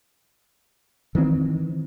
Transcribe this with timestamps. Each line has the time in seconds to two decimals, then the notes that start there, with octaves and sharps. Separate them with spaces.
1.15 D#3 E3 G#3 C4